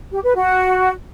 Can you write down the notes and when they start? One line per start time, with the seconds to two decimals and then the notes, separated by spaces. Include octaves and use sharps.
0.12 G4
0.23 B4
0.35 F#4